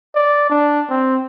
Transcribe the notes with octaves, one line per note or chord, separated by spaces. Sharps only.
D5
D4
C4